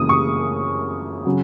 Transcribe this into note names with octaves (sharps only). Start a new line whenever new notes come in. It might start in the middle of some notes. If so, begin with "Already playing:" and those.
Already playing: F#2 C#3 E3 A#3 D#6
C#6
C#3 F#3